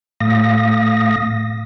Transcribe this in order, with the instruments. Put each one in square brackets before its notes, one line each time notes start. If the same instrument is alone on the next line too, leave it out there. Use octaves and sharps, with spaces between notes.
[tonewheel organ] A2 A3 F5 D#6 A#6